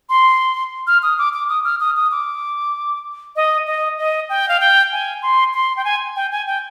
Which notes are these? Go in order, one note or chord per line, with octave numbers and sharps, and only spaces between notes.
C6
F6
D#6
D6
D6
D#6
F6
D#6
D#6
D6
D#5
D#5
D#5
G5
F5
G5
G#5
C6
C6
G5
G#5
G5
G#5
G5